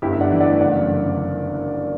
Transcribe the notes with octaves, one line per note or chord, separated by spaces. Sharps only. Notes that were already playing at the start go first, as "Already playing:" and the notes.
G1 E4 G4
E5
G2 D5 F#5
E3
D5 F#5
A3
F#1 D5 F#5
F#2
D3